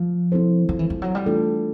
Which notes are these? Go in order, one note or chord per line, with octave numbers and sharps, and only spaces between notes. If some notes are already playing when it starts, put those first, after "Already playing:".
Already playing: F3
C4 E4 A4 C5
F3
E3
F3
F#3
G3
E3 A3 D4 F4 A4